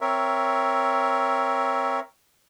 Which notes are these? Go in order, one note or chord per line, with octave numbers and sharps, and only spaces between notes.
C4 A#4 C#5 E5